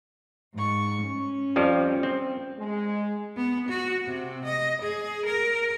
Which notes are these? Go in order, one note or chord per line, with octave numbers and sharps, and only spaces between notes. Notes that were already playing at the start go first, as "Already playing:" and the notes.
G#2 C#6
C#4
F2 F3 G3
C4
G#3
B3
F#4
C3
D#5
G#4
A#4